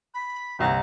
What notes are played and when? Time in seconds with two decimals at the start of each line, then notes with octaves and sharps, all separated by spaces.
0.14 B5
0.59 G1 C2 A#5